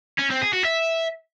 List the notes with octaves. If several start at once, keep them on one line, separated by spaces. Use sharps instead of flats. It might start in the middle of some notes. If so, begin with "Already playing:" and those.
C#4
C4
G#4
F#4
E5